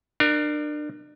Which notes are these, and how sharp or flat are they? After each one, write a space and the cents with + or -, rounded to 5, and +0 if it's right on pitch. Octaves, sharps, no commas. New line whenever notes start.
D4 +30 A#4 +0